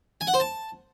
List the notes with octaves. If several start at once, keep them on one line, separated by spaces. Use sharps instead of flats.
G#5
F#5
C5
A5